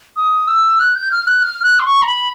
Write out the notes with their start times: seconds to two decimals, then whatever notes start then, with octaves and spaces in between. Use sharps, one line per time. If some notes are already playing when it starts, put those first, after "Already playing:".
0.16 D#6
0.47 E6
0.79 F#6
0.95 G6
1.11 F6
1.27 F#6
1.42 F6
1.63 F#6
1.79 C6
1.85 C#6
2.02 A#5
2.06 B5